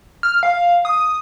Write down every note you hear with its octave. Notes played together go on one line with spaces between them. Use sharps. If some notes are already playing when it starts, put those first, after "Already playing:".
F6
F5
D#6